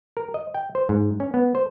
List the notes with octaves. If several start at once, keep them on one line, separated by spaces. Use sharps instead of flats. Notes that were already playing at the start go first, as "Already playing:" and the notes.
A#4
D#5
G5
C5
G#2
C#4
B3
C5